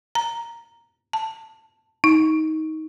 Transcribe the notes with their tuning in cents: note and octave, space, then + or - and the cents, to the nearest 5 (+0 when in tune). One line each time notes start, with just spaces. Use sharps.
A#5 -5
A5 +10
D#4 +15